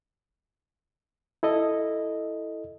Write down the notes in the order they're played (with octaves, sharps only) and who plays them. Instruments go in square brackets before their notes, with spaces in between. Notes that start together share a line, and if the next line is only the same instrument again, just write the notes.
[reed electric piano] E4 A4 D#5